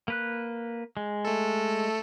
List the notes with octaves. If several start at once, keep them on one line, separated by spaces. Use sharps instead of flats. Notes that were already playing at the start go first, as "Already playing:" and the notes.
A#3 B4 F#6
G#3
A3 A4